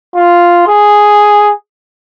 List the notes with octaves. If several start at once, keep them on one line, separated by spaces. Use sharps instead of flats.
F4
G#4